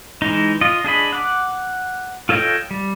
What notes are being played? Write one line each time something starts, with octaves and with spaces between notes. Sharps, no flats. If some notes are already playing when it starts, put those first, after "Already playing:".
E3 G#3 D#4
F4 D#5
D4 G#4 D#5 B5
F#5 D6
F4 A4 C#5 D#5 G5
G3